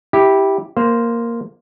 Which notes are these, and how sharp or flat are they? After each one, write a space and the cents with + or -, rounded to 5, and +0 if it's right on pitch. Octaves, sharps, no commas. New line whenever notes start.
E4 -15 G4 +0
A#3 +0 C5 -5